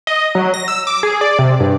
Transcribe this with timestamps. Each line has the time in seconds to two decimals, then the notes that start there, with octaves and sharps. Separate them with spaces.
0.07 D#5
0.35 F#3
0.54 A#6
0.68 E6
0.87 D6
1.03 G#4
1.21 D5
1.39 C3
1.60 G2